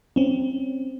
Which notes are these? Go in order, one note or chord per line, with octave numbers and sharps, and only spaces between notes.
C4 C#4